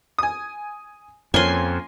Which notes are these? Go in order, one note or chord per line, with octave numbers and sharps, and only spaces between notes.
G#5 D#6
F2 F3 A#3 C#4 G#5 C6